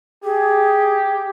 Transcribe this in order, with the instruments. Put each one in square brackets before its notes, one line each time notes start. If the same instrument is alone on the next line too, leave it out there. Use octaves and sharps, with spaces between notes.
[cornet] G4 [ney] G#4